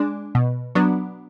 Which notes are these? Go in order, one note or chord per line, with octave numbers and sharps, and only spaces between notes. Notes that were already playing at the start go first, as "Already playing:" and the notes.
Already playing: G#3 D4
B2
F#3 B3 D4